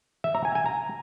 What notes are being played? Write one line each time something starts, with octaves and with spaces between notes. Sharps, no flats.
E5
A#5
G#5
G#5
A#5